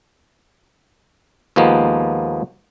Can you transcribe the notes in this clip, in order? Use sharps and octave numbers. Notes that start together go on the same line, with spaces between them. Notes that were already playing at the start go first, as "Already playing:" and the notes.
D#2 F3 G#3 A#3 B3